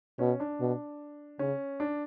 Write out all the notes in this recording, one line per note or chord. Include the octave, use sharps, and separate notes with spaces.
B2 C#4
D4
B2
C#3 C#4
D4